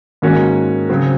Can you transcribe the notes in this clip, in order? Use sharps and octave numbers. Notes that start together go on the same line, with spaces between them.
G#2 D#3 A#3 C#4 F#4
C#3 F#3 C4